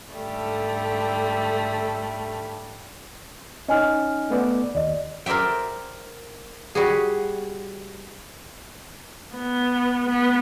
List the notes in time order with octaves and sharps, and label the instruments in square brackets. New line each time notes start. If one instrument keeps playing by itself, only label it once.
[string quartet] G#2 D3 G3 A3
[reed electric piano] C#4 D#4 [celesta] D#5 G#5 F6
[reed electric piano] A3 B3 D5
[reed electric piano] D#2 [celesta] D5 D#5
[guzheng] A#4 C5 D5 E5 G5
G3 F#4 G#4
[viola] B3
B3